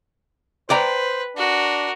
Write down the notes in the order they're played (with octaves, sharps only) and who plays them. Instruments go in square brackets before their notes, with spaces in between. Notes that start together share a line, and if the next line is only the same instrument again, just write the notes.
[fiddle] B4 [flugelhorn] C5 [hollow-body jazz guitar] D5 G5 A#5
[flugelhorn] D4 [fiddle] F#4 A#4